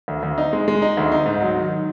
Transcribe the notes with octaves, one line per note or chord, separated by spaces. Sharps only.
D2
D2
D#4
G#3
G#3
D#4
D2
D#4
G#2
F#3
D#3